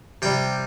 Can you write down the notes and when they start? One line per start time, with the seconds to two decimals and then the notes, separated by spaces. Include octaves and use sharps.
0.22 C3 G3 G5